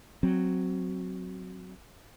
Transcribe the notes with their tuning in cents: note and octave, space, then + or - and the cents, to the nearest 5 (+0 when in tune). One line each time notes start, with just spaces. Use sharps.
F#3 +0 C4 +0